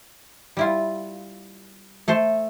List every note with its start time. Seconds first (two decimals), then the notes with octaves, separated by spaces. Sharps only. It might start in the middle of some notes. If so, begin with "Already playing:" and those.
0.57 G3 E4 F4
2.08 A3 A4 C5